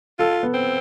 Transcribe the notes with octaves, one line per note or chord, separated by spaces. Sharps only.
F4 A4
B3
C4